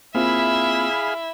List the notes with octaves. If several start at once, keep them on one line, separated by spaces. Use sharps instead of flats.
A#3 C4 E4 F4 G#4 E5 F5 B5